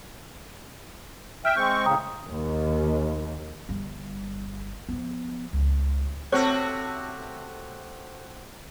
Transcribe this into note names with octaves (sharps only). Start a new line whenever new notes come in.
E5 G5 F6
G#3 C4 C#6 G6
A2 C#3 G5 A#5 D#6
D#2
G1 G3
F3 B3
C#2
C3 A3 C4 F#4 C5 C#5